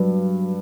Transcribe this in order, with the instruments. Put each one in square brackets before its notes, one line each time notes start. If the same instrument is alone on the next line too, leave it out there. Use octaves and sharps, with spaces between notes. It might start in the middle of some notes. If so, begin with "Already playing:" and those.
Already playing: [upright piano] G2 [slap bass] F#3